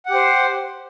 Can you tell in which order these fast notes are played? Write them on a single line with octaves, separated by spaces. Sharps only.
F#5 G4 C5